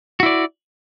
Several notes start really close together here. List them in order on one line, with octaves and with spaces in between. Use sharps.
F#4 E4 D5